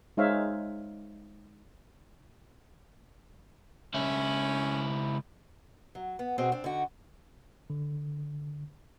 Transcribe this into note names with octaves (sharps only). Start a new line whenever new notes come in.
G#3 D#4 C5 C#5 E5 F5
C#2 C#4 E4
F#3
B3
B2 C4 F#4 G#4
C4 D4
D3 D#4 F#4
D3